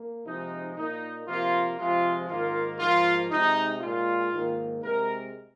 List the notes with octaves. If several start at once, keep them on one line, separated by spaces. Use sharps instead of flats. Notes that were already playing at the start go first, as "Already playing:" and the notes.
Already playing: A#3
C3 F3 G#3 D#4
A#2 A#3 D#4
C3 F3 A#3 F4
C3 F3 G#3 F4
G#2 D#3 A#3 F4
G#2 F3 A#3 F4
C3 G#3 D#4
A#2 G#3 F4
G#2 D#3 A#3
C3 G#3 A#4